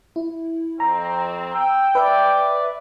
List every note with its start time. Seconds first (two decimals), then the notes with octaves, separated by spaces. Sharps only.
0.16 E4
0.80 F2 C4 A#5
1.55 G5 E6
1.95 B4 D5 E5